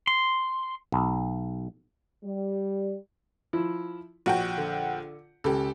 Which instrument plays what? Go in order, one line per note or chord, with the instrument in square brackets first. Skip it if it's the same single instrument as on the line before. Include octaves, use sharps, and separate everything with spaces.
[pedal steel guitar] C6
[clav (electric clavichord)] B1
[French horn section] G3
[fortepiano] F3 E4
[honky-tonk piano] A#1 F#5 G5 [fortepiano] F#4
[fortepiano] D3
[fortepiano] C#2 [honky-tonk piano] G4 A4